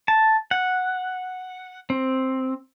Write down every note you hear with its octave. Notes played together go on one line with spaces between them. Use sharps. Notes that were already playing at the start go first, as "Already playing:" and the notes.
A5
F#5
C4